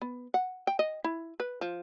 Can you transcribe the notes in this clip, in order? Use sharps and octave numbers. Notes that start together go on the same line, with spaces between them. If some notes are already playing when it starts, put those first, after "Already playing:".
B3
F#5
G5
D#5
E4
B4
F3